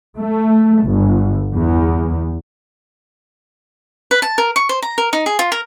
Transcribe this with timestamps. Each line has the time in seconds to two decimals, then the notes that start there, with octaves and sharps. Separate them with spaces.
0.18 A3
0.84 G1
1.53 E2
4.11 B4
4.22 A5
4.38 A#4
4.56 C#6
4.69 C5
4.82 A#5
4.98 A#4
5.13 D#4
5.26 G#4
5.39 F4
5.52 A#4